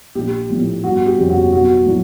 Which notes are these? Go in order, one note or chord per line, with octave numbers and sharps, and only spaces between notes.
A#1 G4
A2 F3
G1 F#4
G4
F2 C#3
F#4
B1 F#4
A2 F#3